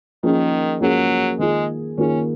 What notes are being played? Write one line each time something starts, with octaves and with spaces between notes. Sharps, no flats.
D#3 F3 A#3 C#4 G#4
F3 F#3 A#3 C#4 G#4
D#3 G#3 A#3 F4 G#4
D#3 A#3 C#4 F4 G#4